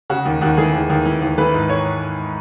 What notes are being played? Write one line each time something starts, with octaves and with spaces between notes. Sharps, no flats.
C#3 F#4
D#2
D#2 F#4
E3 G#4
D#2
D#2
E3
D#2
E3 B4
G#2
C#5